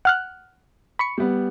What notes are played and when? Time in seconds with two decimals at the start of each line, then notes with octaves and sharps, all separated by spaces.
0.05 F#5 F6 F#6
0.99 B5 C#6 C#7
1.18 G3 B3